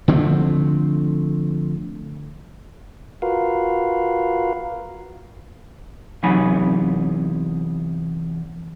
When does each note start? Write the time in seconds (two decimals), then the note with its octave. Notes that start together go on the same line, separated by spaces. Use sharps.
0.08 D3 F3 A3 C4
3.22 F4 F#4 A#4 B4 F5
6.23 E2 C3 F#3 D#4 G#5 B5